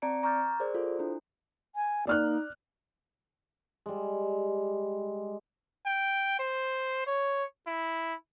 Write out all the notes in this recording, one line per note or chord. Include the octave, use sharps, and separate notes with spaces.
C4 D5 A5 A#5 C#7 D7
A#5 C#6 D6 F6 G6 A6
G#4 A#4 C5 D5
F4 G4 A4 C5
D4 E4
G#5
A#3 D#4 D5 F6 F#6
G3 G#3
G5
C5
C#5
E4